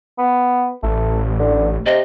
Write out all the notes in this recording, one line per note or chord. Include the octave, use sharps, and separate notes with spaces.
B3
A1 A3
D3
C3 D#5